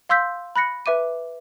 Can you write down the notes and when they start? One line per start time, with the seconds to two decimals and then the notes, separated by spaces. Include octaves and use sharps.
0.09 F5 C6 E6 G6 B6
0.56 B5 F#6 A#6 C#7
0.86 B4 E5 D6 D#7